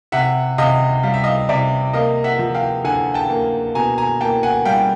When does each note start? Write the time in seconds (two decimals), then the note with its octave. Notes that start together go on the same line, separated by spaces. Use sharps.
0.12 C3 E5 F#5
0.58 C3 D#5 F5
1.03 G3 F5
1.14 E5
1.24 D#5 F5
1.49 C3 D5 E5
1.93 A#3 D#5 F5
2.24 E5 F#5
2.39 F3
2.55 F5 G5
2.84 D3 F#5 G#5
3.14 G5 A5
3.30 A#3
3.75 B2 G#5 A#5
3.98 G#5 A#5
4.21 A#3 G5 A5
4.43 F#5 G#5
4.65 G3 F5 G5